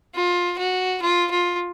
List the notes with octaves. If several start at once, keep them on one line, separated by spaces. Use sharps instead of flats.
F4
F#4
F4
F4